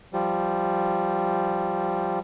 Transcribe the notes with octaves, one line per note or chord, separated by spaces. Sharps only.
F3 G3